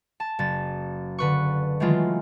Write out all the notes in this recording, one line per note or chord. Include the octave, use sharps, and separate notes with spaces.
A5
F#1 A6
D3 B4 C#6
D#3 E3 F#3 G#3 A3 F4